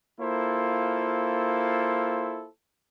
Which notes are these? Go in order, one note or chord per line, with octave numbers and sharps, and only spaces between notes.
A#3 E4 F4 A4 C5